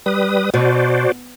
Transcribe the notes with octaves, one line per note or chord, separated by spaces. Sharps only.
G3 B4 D#6
B2 F#4 C5 D5